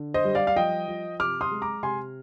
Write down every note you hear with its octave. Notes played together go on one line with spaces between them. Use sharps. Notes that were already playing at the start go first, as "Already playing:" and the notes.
Already playing: D3
C5 D#5
G3
D5 F5
F5
F3 D#5 G5
F3
C3 D6 F6
C6 D#6
G#3
A#5 D6
C3 G#5 C6